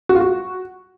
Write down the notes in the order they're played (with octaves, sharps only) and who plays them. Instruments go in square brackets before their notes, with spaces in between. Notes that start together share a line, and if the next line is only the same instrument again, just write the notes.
[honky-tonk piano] F#4
F4
F#4